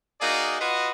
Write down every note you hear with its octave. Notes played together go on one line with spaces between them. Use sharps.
A#3 D#4 F#4 G#4 D5
F4 F#4 B4 D#5